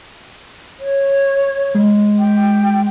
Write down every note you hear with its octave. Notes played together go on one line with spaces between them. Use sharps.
C#5
G#3
G5